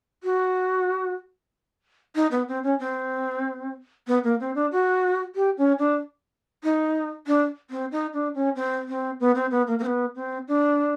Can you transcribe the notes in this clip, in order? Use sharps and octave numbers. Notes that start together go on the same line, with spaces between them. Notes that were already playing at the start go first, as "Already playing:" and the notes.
F#4
D#4
B3
C4
C#4
C4
B3
A#3
C4
D4
F#4
G4
C#4
D4
D#4
D4
C4
D#4
D4
C#4
C4
C4
B3
C4
B3
A#3
A#3
C4
B3
C4
D4